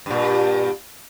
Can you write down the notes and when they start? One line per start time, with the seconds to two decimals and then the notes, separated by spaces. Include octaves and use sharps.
0.06 G2 A#2